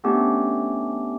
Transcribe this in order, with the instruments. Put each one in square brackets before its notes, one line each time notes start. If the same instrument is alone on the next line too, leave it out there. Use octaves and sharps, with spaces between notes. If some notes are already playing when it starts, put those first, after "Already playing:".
[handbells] A3 B3 C#4 D4 G4